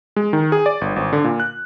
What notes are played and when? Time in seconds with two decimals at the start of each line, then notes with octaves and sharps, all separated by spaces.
0.16 G#3
0.33 D#3
0.52 G#4
0.66 D5
0.81 G1
0.96 G#1
1.13 D3
1.24 A#2
1.40 F#6